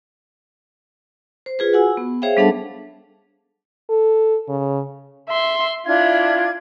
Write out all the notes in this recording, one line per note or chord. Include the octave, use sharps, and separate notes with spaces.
C5
F4 G#4 B4
F#4 F#5 G#5 E6
B3
G#4 C5 C#5 E5 F5 G5
G3 B3 D4 A4 F#5 A5
A4
C#3
E5 C6
D4 E4 F4 G#6